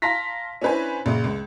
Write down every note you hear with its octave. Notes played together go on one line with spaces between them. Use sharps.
F5 A5 A#5 C6 A#6 B6
C#4 D4 E4 B4 C5 G#5
A#1 C#3
C#2